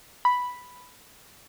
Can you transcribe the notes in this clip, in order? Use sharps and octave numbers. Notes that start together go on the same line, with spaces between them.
B5